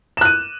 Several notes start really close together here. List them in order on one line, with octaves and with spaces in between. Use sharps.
E7 F#6 D#7